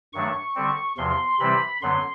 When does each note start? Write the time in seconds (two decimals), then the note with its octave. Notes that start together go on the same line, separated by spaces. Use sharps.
0.13 G2 D#3 F#3 A3 D4 C#6
0.55 D3 G3 C4
0.97 E2 C3 F3 C6
1.39 C3 E3 G3 C4 B5
1.82 F#2 D3 F#3 B3 C6